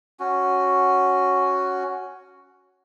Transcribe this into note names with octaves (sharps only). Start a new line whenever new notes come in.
C#4 F#4